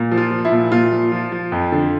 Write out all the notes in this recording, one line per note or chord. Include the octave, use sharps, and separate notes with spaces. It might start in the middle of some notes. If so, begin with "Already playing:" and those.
Already playing: A#2
F3
F4
F3
E4
A#2
A#2 F4
F3
F3
F3
F2
D3